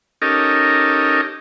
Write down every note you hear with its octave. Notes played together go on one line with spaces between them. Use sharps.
C#4 D#4 G4 A4 A#4 D#5